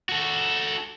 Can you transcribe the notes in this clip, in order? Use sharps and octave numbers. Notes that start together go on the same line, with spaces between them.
F#4 A4